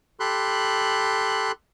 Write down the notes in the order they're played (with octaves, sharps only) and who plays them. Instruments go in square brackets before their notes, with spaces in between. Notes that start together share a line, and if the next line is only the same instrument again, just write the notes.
[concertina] G4 A4 B5 C6 F#6